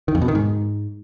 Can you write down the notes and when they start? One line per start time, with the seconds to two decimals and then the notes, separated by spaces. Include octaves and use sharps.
0.08 D#3
0.15 F2
0.22 B2
0.28 D#3
0.35 G#2